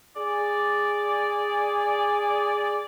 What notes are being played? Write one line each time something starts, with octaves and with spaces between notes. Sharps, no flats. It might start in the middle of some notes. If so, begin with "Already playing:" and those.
G#4 D5